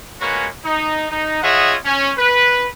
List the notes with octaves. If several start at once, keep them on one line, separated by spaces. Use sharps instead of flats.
G#3 A#3 C#4 F#4 B4 C#5
D#4
D#4
F4 G#4 C#5 D#5 E5 F#5
C#4
B4